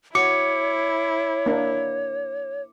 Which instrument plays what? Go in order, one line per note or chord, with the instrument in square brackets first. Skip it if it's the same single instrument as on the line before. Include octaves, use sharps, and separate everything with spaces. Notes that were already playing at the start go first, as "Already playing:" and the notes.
[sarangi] E4 [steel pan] F#4 [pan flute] C#5 [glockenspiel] D6 C#7
[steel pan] A#3 D4